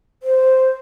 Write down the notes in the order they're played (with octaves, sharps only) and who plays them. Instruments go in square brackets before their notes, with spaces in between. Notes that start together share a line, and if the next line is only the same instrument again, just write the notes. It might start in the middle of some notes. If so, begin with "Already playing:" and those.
[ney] C5